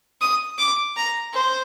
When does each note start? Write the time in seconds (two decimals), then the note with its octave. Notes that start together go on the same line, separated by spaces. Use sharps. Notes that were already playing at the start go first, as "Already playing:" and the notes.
0.21 D#6
0.58 D6
0.96 A#5
1.33 C5